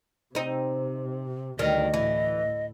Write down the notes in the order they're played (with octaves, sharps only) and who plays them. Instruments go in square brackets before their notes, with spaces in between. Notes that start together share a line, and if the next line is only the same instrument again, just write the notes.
[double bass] C3 [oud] C4 D#4
[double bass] D2 [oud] D#3 G3 [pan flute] D#5
[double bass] A2 [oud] E3